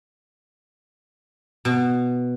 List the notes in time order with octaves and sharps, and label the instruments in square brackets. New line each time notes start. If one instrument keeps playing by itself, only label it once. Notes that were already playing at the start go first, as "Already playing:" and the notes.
[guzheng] B2